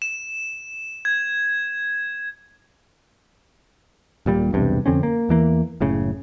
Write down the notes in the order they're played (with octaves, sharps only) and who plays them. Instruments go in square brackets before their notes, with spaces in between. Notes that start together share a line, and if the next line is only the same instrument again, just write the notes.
[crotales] E7
G#6
[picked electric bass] D#1 A#2 G3
B1 E2 G2 C3
F2 D3 C4 C#4
A#3
E2 E3 A#3
F#1 A2 C#3